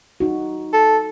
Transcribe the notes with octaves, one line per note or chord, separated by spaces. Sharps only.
D#4 F#4
A4